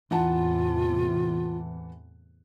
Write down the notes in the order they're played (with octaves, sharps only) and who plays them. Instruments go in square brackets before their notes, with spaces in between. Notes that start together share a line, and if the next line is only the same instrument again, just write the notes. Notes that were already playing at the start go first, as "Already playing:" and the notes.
[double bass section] E2 A2 C3 [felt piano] E3 F#5 A5 [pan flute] F4